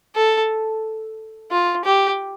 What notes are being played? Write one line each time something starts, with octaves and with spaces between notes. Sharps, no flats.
A4
F4
G4